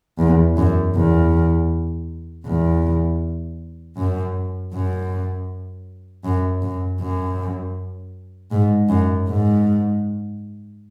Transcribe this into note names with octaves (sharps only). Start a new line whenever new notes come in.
E2
F#2
E2
E2
F#2
F#2
F#2
F#2
F#2
G#2
F#2
G#2